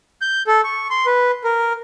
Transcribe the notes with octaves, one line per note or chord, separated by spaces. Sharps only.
G6
A4
C#6
C6
B4
A#4